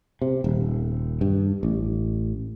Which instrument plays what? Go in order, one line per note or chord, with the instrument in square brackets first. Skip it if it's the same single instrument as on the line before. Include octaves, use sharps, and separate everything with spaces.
[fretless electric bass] C3
D#1
G2
A1